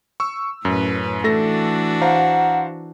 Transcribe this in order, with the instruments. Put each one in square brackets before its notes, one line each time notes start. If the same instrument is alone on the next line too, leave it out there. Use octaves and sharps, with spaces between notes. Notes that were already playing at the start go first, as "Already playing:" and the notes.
[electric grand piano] C#6 E6
[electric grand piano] F#2 [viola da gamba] A2 C#4 B4
[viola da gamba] E3 D4 F#4 [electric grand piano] A3 A4 A#6
[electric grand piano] C5 F5 A#5 [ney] F#5